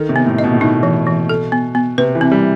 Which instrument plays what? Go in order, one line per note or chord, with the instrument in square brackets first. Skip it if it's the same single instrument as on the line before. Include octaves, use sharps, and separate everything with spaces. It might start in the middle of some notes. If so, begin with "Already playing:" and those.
Already playing: [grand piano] D#3 [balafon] A4
[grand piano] C3
[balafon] B3
[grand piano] A2
[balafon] D#5
[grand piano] B2
A2
[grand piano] B2 [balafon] D#4
[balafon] E3
E3
A4
B3
B3
[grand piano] C3 [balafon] B4
[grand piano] E3
[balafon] C4
[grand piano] G3